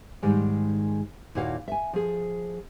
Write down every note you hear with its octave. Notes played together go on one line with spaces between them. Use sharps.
G#2 D#3 G3 G#3
D#2 A#2 E4 F#4 F5
E5 G#5
F3 G#4